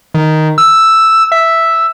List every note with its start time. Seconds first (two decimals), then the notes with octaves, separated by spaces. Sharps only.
0.14 D#3
0.58 E6
1.32 E5